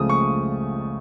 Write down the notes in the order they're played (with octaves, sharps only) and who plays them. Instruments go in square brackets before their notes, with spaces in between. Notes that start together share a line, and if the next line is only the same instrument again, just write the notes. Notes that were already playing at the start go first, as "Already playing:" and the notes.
Already playing: [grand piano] C#2 C#3 F3 A3 D#6
C#6